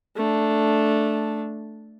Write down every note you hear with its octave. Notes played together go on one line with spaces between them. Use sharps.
A3 D4